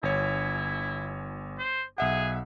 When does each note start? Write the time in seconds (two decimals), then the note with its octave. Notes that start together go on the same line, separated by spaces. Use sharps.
0.03 G1 E4 C#5
1.59 C5
1.98 B1 G#4 E5 F#5